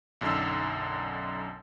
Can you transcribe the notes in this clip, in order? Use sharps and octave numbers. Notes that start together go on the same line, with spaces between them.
B1 F#2 D3 D#4 E6